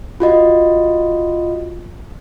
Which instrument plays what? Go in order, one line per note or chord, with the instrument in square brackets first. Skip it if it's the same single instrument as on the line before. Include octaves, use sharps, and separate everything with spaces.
[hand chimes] F4 F#4 D#5